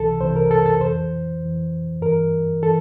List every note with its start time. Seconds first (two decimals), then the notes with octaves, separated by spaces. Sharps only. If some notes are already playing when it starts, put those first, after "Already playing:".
Already playing: C2 C3 E3 A4
0.20 C2 C3 E3 C5
0.36 A#4
0.51 A4
0.66 A4
0.81 F2 E3 C5
1.41 F2 E3
2.02 G2 E3 A#4
2.62 E3 A4